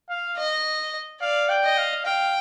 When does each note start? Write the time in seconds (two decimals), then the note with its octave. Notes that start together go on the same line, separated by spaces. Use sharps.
0.10 F5
0.37 D#5
1.21 D5 F5
1.49 G5
1.64 D#5
1.78 F5
2.05 F5 G5